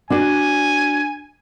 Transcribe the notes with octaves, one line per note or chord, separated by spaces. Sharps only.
D4 F#4 D5 G#5